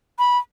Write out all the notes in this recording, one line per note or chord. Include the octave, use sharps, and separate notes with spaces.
B5